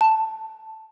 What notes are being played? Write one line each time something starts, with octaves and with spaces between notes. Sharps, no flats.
A5